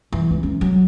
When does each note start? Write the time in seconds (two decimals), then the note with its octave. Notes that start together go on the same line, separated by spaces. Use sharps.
0.12 E3
0.31 C#2
0.43 C#4
0.61 F#3